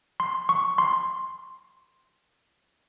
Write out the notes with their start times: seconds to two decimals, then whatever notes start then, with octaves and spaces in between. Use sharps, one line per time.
0.20 C6
0.49 C#6
0.78 C6